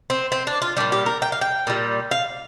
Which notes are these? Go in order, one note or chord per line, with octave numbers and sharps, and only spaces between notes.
C4
C4
D4
F4
A#2 G3 D4
G4
A#4
G5
F5
G5
A#2 G3
F5